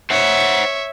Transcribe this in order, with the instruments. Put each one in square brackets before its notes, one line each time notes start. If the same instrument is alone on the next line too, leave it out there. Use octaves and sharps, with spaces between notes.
[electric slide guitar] C5 F#5 [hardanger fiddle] C#5 E5